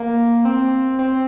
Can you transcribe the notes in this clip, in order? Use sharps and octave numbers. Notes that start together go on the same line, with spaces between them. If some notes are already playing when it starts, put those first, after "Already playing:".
Already playing: A#3
C4
C4